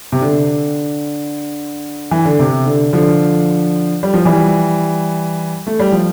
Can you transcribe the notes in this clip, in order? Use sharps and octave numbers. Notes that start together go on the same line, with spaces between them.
C3
D3
E3
D3
C3
D3
D3 F3
G3
F3
E3 G3
A3
G3
F3